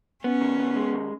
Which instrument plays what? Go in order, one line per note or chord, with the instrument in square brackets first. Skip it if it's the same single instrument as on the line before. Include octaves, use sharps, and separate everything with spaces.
[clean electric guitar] B3 [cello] C#4
[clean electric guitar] D#3
B3
G#3
D#2